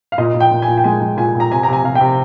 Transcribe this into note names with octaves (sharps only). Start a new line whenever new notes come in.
F5
A#2 D#5
A#2
G5
A#2
G#5
A#2
G5
G#3 G#5
G#3
A#2 G#5
A#2
A#5
C3 G#5
A#5
C3 G#5
C3 F5
G5
C3